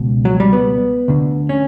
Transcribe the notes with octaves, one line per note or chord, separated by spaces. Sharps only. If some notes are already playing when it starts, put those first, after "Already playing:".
Already playing: C#2 B2
F#3
G3
B3
D2 D3
C#4